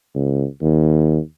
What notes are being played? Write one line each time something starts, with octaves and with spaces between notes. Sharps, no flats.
C#2
D#2